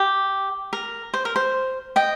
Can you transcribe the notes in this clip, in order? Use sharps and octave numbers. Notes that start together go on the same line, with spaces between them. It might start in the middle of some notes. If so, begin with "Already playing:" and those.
Already playing: G4
A#4
C5
A#4
C5
D#5 G5